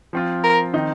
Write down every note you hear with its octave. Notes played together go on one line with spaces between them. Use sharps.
F3 C4 F4
A#4
D#3 C4 D#4